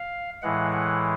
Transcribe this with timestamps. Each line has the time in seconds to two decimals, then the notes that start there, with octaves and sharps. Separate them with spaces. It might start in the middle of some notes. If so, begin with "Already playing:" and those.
Already playing: F5
0.42 A2 E3 G#3 F#5
0.72 F#5